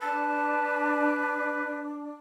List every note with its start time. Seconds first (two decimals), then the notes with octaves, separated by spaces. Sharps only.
0.01 D4 B4 A5